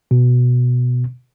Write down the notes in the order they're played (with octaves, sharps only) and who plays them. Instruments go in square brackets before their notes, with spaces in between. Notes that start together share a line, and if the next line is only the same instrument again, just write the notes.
[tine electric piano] B2